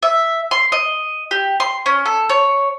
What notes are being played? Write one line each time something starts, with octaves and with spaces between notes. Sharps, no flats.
E5
C6
D#5
G4
C6
C#4
A4
C#5